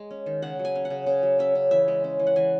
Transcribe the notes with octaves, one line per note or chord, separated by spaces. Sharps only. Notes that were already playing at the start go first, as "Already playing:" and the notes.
Already playing: G#3
C#4
D#3
C#3 F#5
F#3
G#5
C#4
F#5
C#3
C#3
F#3
C#4 E5
C#3
E3 E5
G#3
C#4
E3
F#5
E3 G#5